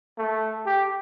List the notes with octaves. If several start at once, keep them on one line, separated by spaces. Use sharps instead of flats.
A3
G4